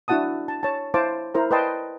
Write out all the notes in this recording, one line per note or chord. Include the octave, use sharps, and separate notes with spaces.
D4 E4 F#4 F#5 A5 D#6
A5
C#5 A5
E4 C5 F5 A5 D6
E4 A#4 C5 A#5
B4 D5 D#5 G5 A5 C6